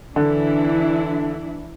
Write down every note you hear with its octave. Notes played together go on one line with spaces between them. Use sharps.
D3 E3 D4 E4